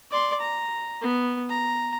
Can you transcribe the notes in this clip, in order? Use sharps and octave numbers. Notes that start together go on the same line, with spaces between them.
D5 C6
A#5
B3
A#5